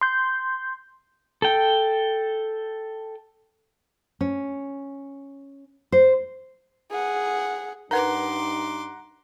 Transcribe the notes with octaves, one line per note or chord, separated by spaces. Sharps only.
C6 G6
A4 G5
C#4
C5
G#4 F#5
G2 D#4 A#4 B4 F#5 A#5 C6 D6